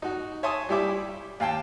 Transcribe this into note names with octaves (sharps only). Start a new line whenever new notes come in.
D#4 F#4
C#5 E5 G#5 A5 C6 D#6
G3 E4 G4 E5 D6
D#2 F5 G5 A5